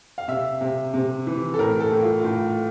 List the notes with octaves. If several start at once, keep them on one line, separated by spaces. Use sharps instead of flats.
F5
C3 E5
C3
C3
E3
A4
A2 A#4
A4
A2
F4
A2 F4